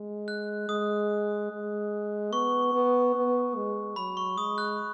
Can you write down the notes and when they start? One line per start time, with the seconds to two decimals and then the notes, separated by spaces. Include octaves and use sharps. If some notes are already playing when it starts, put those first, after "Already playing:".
Already playing: G#3
0.28 F#6
0.69 G#3 D#6
1.51 G#3
2.33 B3 C#6
2.73 B3
3.15 B3
3.56 G#3
3.96 F#3 B5
4.17 C#6
4.38 G#3 D#6
4.58 F#6